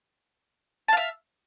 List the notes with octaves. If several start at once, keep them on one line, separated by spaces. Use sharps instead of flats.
E5 F5 A5